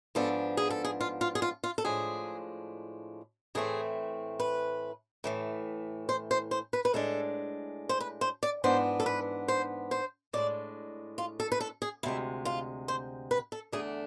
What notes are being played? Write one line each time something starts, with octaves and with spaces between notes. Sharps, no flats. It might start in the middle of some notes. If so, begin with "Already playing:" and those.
G#2 F3 B3 D4 A4
G#4
A4
G#4
F4
F4
G#4
F4
F4
A4
A2 F3 G#3 D4 G#4
A2 E3 A3 C4 G#4
B4
A2 E3 A3
C5
C5
C5
B4
B4
A2 G#3 D4 A4
C5
B4
C5
D5
G#2 E3 B3 D4 C5
A4
B4
C5
C5
A2 G#3 D4 D5
F4
A4
B4
A4
G#4
D2 C3 G#3 E4
F4
C5
B4
A4
E2 D3 A3 D4 G#4